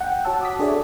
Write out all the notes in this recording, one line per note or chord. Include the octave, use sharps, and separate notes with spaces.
F#5 G5
F#4 C#5 A5 E6
D6 D#6 B6
D4 G#4 A4 C#5 D5 E5